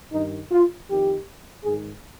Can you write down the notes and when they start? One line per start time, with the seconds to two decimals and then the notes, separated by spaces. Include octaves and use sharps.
0.13 G2 D#3 D#4
0.51 F4
0.88 F2 D#3 G4
1.64 G#2 D#3 G#4